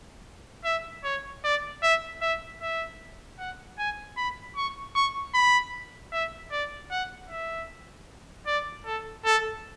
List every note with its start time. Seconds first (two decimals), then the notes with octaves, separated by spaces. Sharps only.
0.65 E5
1.04 C#5
1.44 D5
1.83 E5
2.21 E5
2.61 E5
3.39 F#5
3.78 G#5
4.17 B5
4.56 C#6
4.95 C#6
5.34 B5
6.12 E5
6.52 D5
6.91 F#5
7.30 E5
8.47 D5
8.86 A4
9.25 A4